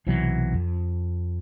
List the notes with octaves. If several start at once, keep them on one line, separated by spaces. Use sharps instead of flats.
B1 C3 E3 F#3
F2